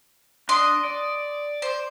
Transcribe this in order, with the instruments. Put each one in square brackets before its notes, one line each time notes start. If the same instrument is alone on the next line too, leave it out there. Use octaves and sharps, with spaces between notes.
[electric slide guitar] D4 [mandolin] D#5 C6
[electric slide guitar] D5
[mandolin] C5